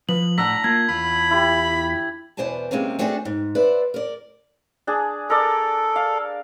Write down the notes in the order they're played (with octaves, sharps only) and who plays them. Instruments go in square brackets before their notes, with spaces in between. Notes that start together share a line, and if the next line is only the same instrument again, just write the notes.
[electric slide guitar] F3 [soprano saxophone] B4 [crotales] F#7
[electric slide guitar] A2 F#5 [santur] D4 E6 [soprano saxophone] A#5 [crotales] B6
[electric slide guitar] A#3 F4 [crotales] G#6
[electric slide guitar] E2 F4 [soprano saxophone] B5
[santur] E4 G4
[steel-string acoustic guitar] E2 B2 C5 D5 G#5 A5
C3 G#3 A#3 C4 C#4
A3 C4 D4 F#4 G#4 A4
G#2
B4 C5 D5 E5 F#5
A#4 D5
[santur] D4 G#4
[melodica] A4 [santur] A#4 D5
[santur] F5